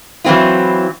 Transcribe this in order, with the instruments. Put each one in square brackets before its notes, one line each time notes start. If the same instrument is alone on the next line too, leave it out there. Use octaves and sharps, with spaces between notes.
[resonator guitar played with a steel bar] E3 F#3 A#3 C4 E4 F4